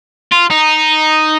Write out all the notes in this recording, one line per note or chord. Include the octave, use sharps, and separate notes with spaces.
F4
D#4